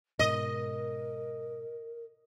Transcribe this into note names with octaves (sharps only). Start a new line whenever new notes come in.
G#2 B2 A#4 D#5